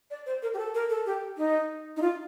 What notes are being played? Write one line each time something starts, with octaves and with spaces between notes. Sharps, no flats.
D5
C5
A#4
G4
A4
A#4
A4
G4
D#4
D#4
F4